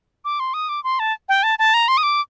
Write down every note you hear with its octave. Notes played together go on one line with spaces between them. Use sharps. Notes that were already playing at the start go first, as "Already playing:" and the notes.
D6
C6
D#6
D6
C6
A5
G5
A5
A5
A#5
C6
D#6
D6